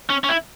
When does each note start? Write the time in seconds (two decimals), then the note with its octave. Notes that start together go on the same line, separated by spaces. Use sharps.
0.10 C#4
0.24 C#4
0.29 E4